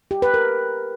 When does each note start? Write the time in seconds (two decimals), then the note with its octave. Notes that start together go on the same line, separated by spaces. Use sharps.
0.11 G4
0.22 B4
0.34 A#4